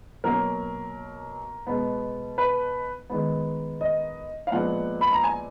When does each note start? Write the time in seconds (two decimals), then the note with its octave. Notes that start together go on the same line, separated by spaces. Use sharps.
0.24 B2 F#3 A#3 A#4
1.67 B2 G#3 B3
2.38 B4
3.10 D#3 G#3 B3
3.81 D#5
4.47 F5
4.52 A#2 F3 G#3 B3 F#5
5.01 B5
5.12 A#5
5.24 G#5